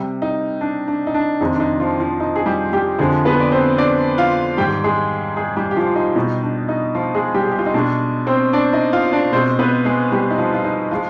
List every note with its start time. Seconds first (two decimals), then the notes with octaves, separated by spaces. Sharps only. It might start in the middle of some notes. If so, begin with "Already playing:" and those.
Already playing: C3 G3
0.22 D#4
0.61 D4
0.88 D4
1.07 D#4
1.14 D4
1.41 F2 C3 D#3 G#3 D#4
1.55 D4
1.60 D#4
1.80 F3 F4
2.00 F3 F4
2.20 D#4
2.36 G#4
2.46 G3 G4
2.73 G3 G4
2.99 F2 D3 F3 G#3 G#4
3.25 B3 B4
3.40 D5
3.51 C4 C5
3.78 D4 D5
4.18 F4 F5
4.58 G#2 D#3 G3 G4 G5
4.84 G#3 G#4
5.37 G#3 G#4
5.56 G3 G4
5.71 G4
5.76 F3 F4
5.96 D#4
6.15 B2 G3 D#4
6.43 D4
6.69 D#4
6.95 F3 F4
7.14 G#3 G#4
7.34 G3 G4
7.44 G#4
7.52 G4
7.59 F4
7.66 D#4
7.74 B2 G#3 D4
8.27 C4 C5
8.53 D4 D5
8.73 D#4 D#5
8.93 F4 F5
9.13 D4 D5
9.32 B2 G#3 C4 C5
9.59 B3 B4
9.85 G#3 G#4
10.12 G3 G4
10.31 D#4
10.38 F3 F4
10.54 F4
10.64 D#4
10.91 F3 G#3 F4